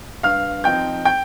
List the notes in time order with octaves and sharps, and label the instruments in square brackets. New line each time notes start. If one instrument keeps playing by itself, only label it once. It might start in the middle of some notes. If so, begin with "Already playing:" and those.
[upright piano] G2 F5 F6
F3 C4 D#4 G5 G6
G5 G6